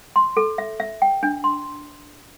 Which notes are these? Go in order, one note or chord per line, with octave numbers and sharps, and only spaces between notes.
C6
A4
E5
E5
G5
D4
C6